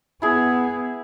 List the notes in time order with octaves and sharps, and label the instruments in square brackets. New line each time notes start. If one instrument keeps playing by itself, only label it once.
[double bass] B3 [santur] E4 G#4